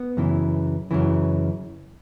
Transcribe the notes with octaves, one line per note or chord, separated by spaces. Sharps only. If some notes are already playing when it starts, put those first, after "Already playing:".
Already playing: B3
F#2 C#3 E3
F#2 C#3 E3